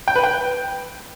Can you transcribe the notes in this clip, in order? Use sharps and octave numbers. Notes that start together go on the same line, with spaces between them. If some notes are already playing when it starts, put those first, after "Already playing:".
G5
B4
G5